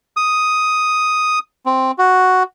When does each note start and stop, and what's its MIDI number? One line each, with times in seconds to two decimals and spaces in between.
0.17 1.39 87
1.66 1.91 60
1.99 2.43 66